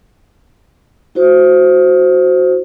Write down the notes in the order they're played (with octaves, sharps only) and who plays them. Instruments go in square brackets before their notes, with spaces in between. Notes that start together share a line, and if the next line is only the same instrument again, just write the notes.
[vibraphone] E4 F#4 C5